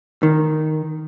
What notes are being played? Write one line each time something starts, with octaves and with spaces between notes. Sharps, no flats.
D#3